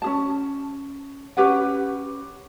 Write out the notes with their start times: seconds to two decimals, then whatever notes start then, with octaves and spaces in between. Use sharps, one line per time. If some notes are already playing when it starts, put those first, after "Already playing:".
0.02 C#4 G#4 A5
1.37 C#4 G4 B4 F#5